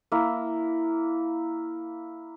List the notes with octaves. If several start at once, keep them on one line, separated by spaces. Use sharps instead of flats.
A#3 E4